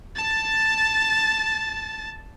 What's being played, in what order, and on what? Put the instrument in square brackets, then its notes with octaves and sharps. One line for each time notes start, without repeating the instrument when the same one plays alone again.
[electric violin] A5 A6